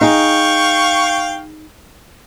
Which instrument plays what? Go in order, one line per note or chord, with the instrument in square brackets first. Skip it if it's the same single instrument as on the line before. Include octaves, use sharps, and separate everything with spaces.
[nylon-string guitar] D#4 G#4 [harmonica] F5 G5 C#6